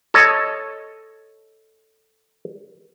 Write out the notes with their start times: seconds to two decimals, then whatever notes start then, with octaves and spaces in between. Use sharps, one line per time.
0.14 A4 C#5 D#5